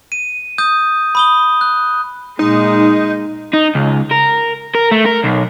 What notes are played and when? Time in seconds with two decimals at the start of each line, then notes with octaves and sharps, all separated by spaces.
0.12 D#7
0.58 D#6 G6
1.15 B5 D#6 G7
1.61 F#6
2.39 A#2 G#3 D#4
3.53 D#4
3.75 C#2
4.11 A#4
4.75 A#4
4.92 A3
5.05 A#4
5.24 B1